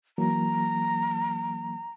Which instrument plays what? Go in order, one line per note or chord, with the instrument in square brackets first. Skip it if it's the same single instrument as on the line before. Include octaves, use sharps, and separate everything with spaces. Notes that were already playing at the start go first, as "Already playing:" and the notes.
[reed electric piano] E3 F#3 A#3 [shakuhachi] A#5